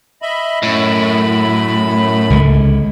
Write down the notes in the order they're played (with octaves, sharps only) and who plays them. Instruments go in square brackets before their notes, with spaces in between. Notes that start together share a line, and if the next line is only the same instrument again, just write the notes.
[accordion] D#5 E5 B5
[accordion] F#2 B5 [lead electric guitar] A2
[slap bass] C#2 D3 G#3